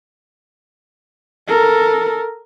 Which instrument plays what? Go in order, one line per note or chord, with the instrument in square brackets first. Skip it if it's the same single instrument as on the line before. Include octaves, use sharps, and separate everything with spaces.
[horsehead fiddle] A4 A#4